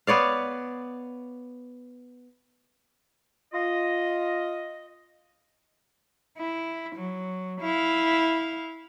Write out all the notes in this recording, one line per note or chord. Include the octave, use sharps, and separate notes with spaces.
B3 C#5 D5 F5
F4 D#5
E4
F#3
E4 F5